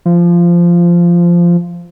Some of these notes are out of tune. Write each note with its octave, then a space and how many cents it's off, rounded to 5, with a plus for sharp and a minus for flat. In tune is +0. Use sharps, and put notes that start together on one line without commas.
F3 -15